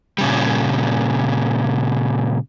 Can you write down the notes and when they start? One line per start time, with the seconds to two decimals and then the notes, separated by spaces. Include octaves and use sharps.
0.18 A#2 C#3 G3